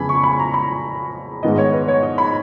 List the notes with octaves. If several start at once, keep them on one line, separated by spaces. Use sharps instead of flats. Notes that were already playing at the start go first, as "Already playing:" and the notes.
Already playing: F2 C#3 G#3 B3 G#5 B5
C#6
B5
A#5
B5
G#2 D#3 G#3 B3 D#5
C#5
B4
C#5
D#5
B5